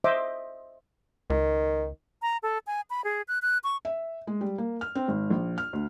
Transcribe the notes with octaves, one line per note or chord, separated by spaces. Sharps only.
C5 D#5 E5 D6
C#2 D#3
A#5
A4
G#5
B5
G#4
F#6
F#6
C#6
E5
G#3
G3
A#3
F6
C4
G#1
A#1
F6
D2